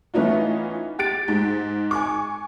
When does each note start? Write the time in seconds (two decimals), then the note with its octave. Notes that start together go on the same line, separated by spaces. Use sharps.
0.14 E3 A3 B3 C#4 D#4 F4
0.99 G4 A6 D7
1.28 G#2
1.91 G#5 C#6 D6